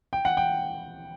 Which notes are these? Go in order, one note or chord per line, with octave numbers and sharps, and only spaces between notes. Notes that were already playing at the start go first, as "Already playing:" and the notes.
G5
F#5
G5